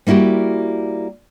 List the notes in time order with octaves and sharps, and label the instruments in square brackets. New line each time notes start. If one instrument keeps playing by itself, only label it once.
[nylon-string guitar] G3 A#3 E4 F#4 G4